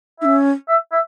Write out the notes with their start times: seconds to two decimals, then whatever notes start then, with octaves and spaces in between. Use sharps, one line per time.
0.20 D#4 E5
0.25 C#4
0.69 E5
0.92 E5